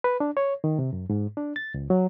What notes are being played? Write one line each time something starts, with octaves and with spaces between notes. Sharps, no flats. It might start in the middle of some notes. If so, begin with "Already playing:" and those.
B4
D4
C#5
D#3
C3
F#2
G#2
D4
A6
C#2
F#3